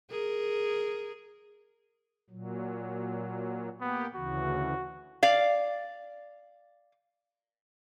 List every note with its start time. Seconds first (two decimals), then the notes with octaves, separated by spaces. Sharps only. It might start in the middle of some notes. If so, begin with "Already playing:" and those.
0.10 G#4 A#4
2.30 A#2 F#3
3.81 A#3 B3 G4
4.15 D2 C#3 E3 F#4
5.23 D5 F5